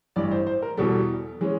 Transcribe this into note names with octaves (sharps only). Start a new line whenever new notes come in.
A1 G2 E3 D5
C5
C5
A#4
E2 B2 G3 A4
E3 G#3 C#4